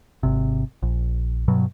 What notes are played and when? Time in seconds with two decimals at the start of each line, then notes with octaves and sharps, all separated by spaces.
0.23 G#1 C3
0.83 A#1
1.48 G2 B2 F#3